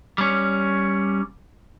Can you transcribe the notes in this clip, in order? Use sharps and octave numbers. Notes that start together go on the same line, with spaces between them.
G3 C#4